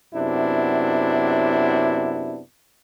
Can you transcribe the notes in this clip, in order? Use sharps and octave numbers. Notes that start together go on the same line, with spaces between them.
F#2 C3 B3 D4 E4